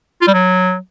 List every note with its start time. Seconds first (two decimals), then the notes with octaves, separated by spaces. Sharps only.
0.21 F4
0.27 G3
0.34 F#3